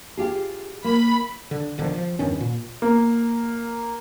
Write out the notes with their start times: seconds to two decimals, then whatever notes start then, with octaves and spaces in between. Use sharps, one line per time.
0.17 F4 G4 G#4
0.84 A#3 B5
1.51 D3
1.78 B1 D3 D#3 F3
1.94 F3
2.19 E2 G2 D#3 C#4
2.40 A#2
2.82 A#3